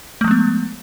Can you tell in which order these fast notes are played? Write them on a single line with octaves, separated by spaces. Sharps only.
A3 F3 G#3 B3